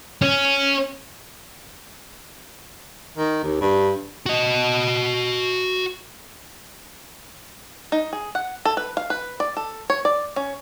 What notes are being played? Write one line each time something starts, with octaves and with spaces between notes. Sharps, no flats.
C#4
D#3
D#2
G2
F#4 D#5
D#4
G#4
F#5
A4
B4
F5
B4
D5
A4
C#5
D5
C#4